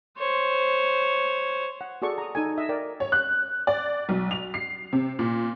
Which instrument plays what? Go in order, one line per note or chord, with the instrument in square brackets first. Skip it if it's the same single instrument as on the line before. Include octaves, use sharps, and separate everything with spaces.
[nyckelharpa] C5 C#5
[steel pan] F#5
F#4 G#4 A4 D5 C#6
A#5 D#6
D#4 A4 G#5
D#5 E5
A#4 D5 G5
[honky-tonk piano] C#5
F#6
D5
B1
F7
C7
C3
A#2